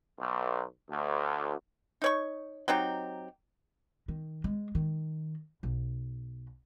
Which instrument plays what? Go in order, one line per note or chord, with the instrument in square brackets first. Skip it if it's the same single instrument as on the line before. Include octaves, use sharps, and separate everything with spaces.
[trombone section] B1
D2
[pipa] D#4 C#5 C#6
F#3 C4 D#4 G4
[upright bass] D#3
G#3
D#3
B1